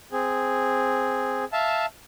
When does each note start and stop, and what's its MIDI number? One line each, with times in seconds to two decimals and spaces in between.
0.12 1.45 60
0.12 1.45 68
1.53 1.86 76
1.53 1.86 77
1.53 1.86 81